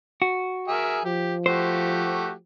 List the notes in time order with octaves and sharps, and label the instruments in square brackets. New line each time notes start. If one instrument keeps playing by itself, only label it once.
[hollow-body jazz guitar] F#4
[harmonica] G#4 A#4 E5
[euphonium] F3 [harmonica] G4
[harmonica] A3 F#4 G4 [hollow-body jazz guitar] C5